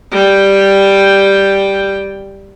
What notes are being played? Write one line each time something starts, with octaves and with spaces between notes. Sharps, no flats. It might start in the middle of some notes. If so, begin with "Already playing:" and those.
G3 G5